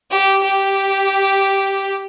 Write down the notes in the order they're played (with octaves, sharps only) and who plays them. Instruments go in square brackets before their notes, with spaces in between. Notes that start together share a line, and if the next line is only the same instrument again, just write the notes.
[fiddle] G4
G4